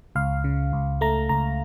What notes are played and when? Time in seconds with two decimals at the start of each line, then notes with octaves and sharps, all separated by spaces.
0.15 C#2 F5
0.44 C#3
0.73 C#2
1.01 A3 A#5
1.29 C#2 A#5